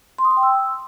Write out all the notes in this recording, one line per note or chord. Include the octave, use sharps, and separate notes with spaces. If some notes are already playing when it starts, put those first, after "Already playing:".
C6
D#6
C6
G5
E6